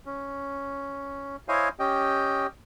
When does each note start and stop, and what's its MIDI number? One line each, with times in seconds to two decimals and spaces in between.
0.06 1.36 61
1.48 1.69 64
1.48 1.69 72
1.48 1.69 73
1.48 1.69 75
1.48 1.69 77
1.48 1.69 80
1.79 2.47 61
1.79 2.47 67
1.79 2.47 75
1.79 2.47 79